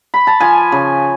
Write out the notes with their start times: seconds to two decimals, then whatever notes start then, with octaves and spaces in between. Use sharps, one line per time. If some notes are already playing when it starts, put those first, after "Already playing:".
0.14 B5
0.27 A5
0.40 F3 G#5
0.72 C#3